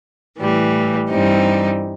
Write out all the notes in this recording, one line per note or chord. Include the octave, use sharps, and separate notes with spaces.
A2 E3 G3
G2 E3 G3 C4 D#4